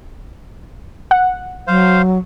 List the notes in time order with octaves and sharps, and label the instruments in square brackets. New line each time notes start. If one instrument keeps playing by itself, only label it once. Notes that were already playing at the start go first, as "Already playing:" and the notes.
[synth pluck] F#5
[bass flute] F#3 [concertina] C5 F5